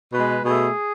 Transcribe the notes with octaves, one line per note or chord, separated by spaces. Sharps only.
B2 G#3 B4
B2 A3 G#4